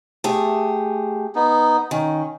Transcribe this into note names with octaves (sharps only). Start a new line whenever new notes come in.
A3 G4 G#4
B3 D#4
D#3 C#4